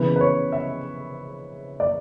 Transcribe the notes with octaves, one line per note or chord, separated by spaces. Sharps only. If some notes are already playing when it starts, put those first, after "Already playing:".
Already playing: C#3 E3 B3 B4
B4
C#5
E5
D5